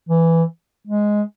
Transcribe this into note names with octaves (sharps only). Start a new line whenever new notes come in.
E3
G#3